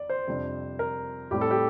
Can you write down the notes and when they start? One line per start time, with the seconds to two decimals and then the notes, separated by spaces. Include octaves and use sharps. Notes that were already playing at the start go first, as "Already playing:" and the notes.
Already playing: D5
0.10 C5
0.27 F2 C3 G3 D4
0.79 A#4
1.31 A2 G3 C4 G4
1.41 A4
1.51 G4